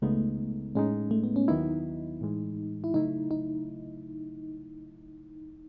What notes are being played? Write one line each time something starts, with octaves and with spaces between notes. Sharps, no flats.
C#2 C#3 G#3 A3 B3 D#4
A2 G#3 C#4 D#4
A3
B3
C#4
D#2 D#3 F#3 B3 D#4 E4
A2 E3 G#3
E4
C#3 F#3 A3 D#4 E4
D#4